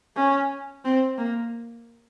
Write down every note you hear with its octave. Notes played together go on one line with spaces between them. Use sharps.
C#4
C4
A#3